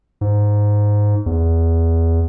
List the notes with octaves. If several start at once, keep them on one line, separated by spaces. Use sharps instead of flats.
G#2
E2